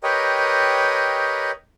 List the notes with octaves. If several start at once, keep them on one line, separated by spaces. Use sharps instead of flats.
G4 A#4 B4 C#5 D#5 G5